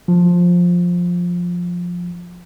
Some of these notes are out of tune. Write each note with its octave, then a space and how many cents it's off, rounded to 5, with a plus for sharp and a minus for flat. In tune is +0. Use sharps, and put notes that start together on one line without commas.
F3 +10